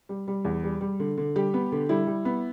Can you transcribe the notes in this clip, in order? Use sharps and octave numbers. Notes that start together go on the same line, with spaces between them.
G3
G3
E2
G3
G3
D3
D3
G3 G4
B3
D3
G3 E4
G3
B3